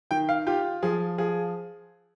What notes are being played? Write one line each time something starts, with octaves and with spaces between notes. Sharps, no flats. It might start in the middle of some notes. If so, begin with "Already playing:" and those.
D#3 G5
F5
F4 G4
F3 G#4
F3 G#4